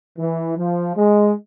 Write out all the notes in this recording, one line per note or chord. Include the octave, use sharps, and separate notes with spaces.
E3
F3
G#3